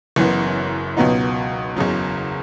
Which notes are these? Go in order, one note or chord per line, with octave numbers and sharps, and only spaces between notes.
F#1 F#2 E3 B3
C#2 B2 F#3 B3 D#4
F#1 E2 C#3 F#3